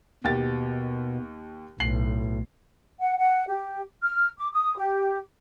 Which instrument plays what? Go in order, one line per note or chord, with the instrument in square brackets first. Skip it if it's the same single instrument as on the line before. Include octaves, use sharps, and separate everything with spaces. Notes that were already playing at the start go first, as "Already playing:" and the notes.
[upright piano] D#2 G4 A6 [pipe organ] B2
[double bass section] B1 [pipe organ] A2 [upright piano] C7 F#7
[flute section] F#5
F#5
G4
F6
D6
D#6
G4